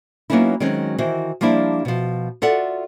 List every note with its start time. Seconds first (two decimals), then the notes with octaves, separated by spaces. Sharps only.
0.30 F#3 A#3 B3 C#4 D#4 E4
0.60 D#3 F#3 G#3 C4 C#4
0.98 D#3 E3 E4 F#4 C5
1.41 F3 G3 A#3 D4 E4
1.85 B2 F3
2.42 F4 F#4 A4 D5 E5 F#5